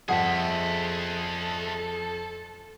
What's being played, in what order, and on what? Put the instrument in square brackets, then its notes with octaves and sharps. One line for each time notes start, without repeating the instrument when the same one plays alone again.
[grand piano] F2 [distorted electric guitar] G#4 E5 [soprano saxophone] A4 [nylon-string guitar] F#5 G5